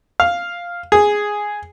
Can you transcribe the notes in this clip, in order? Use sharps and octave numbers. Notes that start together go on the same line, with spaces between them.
F5
G#4